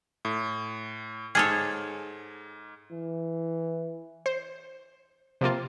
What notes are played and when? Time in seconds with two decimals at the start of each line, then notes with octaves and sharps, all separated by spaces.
0.25 A2
1.35 G#2 G#4 A4 C#5 F6
2.92 E3
4.26 C5
5.41 C3 F3 A#3 F4